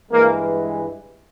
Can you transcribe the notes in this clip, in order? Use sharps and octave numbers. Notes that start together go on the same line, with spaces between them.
G2 E3 G#3 A#3